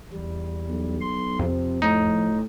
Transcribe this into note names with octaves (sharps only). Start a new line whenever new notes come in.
E2 G3
B1
C6
F2 C3 F3
A2 D#4